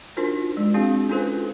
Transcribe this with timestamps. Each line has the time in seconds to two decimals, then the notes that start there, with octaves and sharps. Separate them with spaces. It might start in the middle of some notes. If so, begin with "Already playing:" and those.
0.17 D4 D#4 F4 F#4 A#4 C5
0.57 G#3
0.74 C4 D4 F#4 G#4 F5
1.09 C#4 D#4 F4 A4 B4 C5